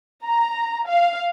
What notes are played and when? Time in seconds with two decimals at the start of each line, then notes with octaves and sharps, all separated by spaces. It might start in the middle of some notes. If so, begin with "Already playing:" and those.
0.25 A#5
0.87 F5